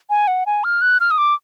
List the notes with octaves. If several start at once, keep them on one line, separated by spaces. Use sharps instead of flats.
G#5
F#5
G#5
F6
F#6
F6
D#6
D6